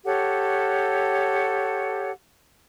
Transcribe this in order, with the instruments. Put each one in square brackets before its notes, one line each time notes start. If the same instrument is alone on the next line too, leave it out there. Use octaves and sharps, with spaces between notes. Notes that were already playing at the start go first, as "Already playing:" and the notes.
[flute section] G4 A4 C#5 F#5